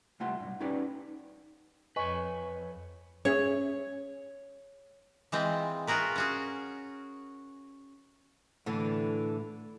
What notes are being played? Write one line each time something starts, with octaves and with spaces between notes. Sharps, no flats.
C2 G3 A3 F4 F#5 C6
B1 G2
C#4 D#4 G4 B4 D5
F2 B4 C#5 D#5 G#5 C#6
C#4 G#4 C#5 E5
E3 G#3 C4 F4
F4 F#4 G#4 A#4 B4
C#4 F#4 G#4
A2 D3 E3 D4